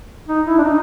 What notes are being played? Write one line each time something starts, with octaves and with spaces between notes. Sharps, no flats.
D#4
E4
D4
D#4